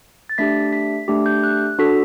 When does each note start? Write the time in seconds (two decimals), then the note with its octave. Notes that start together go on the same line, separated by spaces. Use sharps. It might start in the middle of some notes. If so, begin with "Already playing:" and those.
0.29 A6
0.38 A3 D4 G4 B6
0.73 B6
1.08 A3 D4 G4
1.26 G6
1.43 F#6
1.78 D4 F#4 A4 B6